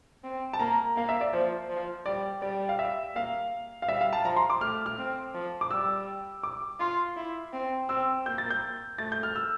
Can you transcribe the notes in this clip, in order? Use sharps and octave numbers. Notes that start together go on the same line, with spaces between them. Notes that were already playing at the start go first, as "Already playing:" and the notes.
C4
A5
A#3 A#5
A#3 F5
E5
D5
F3 C5
F3
G3 D5
G3 D5
F5
E5
A#3 F5
F5
G3 E5
F5
A5
F3 A#5
C6
D6
A3 F6
F6
C4
F3
D6
G3 E6
D6
F4 C6
E4
C4
C4 E6
A#3 G6
A6
G6
A3 A6
G6
F6
E6